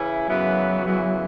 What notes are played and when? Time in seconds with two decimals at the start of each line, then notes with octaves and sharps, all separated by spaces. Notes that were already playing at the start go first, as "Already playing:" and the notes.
Already playing: C#3 E3 C#4 E4
0.29 F#2 C#3 E3 F#3 B3 E4
0.85 F#2 C#3 E3 B3 E4